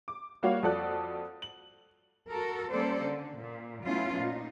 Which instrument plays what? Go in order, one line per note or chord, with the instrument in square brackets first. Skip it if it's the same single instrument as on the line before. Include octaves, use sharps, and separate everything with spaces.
[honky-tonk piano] D6
G3 A#3 F4 F#4 C#5 F5
F2 F4 F#4 A4 D5 F#6
F#7
[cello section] F#4 A4 A#4
G3 A#3 C#4 A4 C5 D5
D3
A#2
F#3 A3 B3 C#4 E4 F4
A#2 D#4